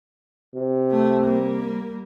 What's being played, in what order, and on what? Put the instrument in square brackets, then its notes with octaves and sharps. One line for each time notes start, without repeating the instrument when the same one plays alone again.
[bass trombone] C3
[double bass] A3
G3 A#3